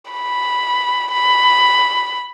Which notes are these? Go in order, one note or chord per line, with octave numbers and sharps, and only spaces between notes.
B5
B5